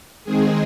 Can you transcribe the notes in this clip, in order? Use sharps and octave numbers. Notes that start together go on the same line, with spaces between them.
D#3 G#3 C4 G#4